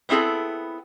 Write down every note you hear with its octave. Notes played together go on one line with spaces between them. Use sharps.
B3 C4 E4 G#4 A4